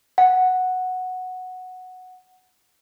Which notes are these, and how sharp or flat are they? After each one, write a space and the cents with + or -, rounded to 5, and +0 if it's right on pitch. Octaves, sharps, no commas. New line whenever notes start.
F#5 -5